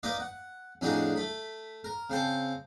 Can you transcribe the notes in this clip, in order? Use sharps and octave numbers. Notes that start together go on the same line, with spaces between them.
A#3 D#4 B4 D5 D#5
F#5
F2 A2 D4 D#4 F#4 G#4
A3 B5
A#4
C#3 C4 C5 A5